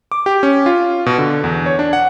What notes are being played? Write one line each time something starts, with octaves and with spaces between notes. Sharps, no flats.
D6
G4
C#4
F4
B2
D3
E2
C#5
D4
F#5